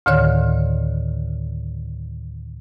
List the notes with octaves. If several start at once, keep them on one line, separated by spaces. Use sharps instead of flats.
D2 A2 D3 D#3 C#5 F6